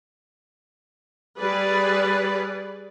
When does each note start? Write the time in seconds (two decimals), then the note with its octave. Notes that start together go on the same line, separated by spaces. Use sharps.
1.38 G3 G#4 B4 D5